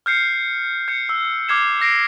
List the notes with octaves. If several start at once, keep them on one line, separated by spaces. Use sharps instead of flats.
F6 G6 C7 C#7
G6 C#7
E6
D6 F6 G#6 C7 E7
E6 A#6 C7 D7